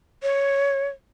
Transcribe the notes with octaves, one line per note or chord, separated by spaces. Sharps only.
C#5